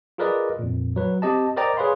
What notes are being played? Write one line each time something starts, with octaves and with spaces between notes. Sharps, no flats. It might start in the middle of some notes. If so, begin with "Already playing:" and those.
F4 G#4 A#4 B4 D5 D#5
F2 A#2
F#3 B4
C4 G4 D#5 A5
A#4 C5 D5 D#5 G5 A#5
G#4 B4 C#5 F5 B5 C6